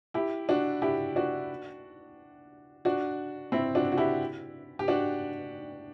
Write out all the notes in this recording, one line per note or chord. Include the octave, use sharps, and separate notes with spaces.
E4 G4
D4 F#4
E4 G4
D4 F#4
D4 F#4
C4 E4
D4 F#4
F#4
E4 G4
G4
D4 F#4